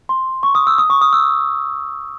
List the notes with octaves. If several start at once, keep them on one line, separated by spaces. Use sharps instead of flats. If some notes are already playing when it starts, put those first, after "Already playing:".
C6
C#6
D#6
E6
D#6
C#6
D#6
E6